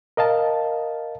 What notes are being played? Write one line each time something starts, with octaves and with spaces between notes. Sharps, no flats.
A#4 D#5 F5 A5